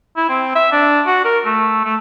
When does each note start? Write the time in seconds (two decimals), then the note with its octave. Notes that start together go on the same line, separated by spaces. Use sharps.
0.17 E4
0.29 C4
0.55 E5
0.72 D4
1.06 F#4
1.25 A#4
1.45 A3
1.85 A3